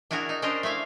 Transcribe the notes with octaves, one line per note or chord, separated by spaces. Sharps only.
D4 E4 F#4 G#4 A#4
D#4
C#4 D4 G4 A#4 C5 D#5
A3 E4 E5 F5